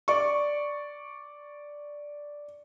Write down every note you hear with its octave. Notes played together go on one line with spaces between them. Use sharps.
D5 C#6